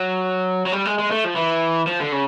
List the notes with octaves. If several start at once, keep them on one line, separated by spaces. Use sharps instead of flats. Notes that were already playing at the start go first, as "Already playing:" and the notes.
Already playing: F#3
F#3
G3
G#3
G#3
A3
F3
E3
F3
D3
C#3